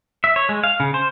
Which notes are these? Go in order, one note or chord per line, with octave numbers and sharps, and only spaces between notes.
E5
C#5
G#3
F5
C#3
C5